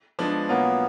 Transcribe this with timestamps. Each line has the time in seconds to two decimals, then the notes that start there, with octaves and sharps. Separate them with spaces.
0.19 F3 G#3 B3 D4
0.49 B2 F#3 A#3 B3 C#4 F4